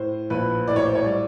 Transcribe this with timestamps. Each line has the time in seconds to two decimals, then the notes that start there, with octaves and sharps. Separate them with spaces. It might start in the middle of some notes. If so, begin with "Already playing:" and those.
Already playing: A2 C5
0.30 A#1 B4
0.68 A2 D5
0.76 C#5
0.86 C5
0.95 C#5
1.04 G3 D5